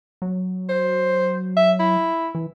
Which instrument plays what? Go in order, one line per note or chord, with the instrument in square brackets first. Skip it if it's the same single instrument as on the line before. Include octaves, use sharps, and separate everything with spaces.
[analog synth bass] F#3
[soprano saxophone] C5
E5
E4
[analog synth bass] E3